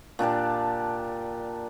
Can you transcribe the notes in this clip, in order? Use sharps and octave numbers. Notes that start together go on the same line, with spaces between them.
A#2 D4 G4 A5